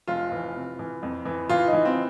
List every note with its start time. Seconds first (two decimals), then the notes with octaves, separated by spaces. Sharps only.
0.08 F1 F4
0.32 E3
0.56 C3
0.79 E3
1.03 F2
1.25 E3
1.49 E3 F4
1.67 D#4
1.73 E3
1.85 C4